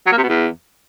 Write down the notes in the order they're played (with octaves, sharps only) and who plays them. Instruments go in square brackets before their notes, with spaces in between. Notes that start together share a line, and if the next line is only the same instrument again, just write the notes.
[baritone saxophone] F#3
A#3
C3
B2
E2